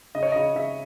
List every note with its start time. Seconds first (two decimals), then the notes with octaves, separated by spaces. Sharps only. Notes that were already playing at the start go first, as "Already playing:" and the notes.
0.15 C#3 D#5
0.23 C#5
0.32 C#3 D#5
0.56 C#3 E5